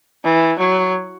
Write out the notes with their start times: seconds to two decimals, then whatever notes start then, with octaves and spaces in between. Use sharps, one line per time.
0.24 E3
0.59 F#3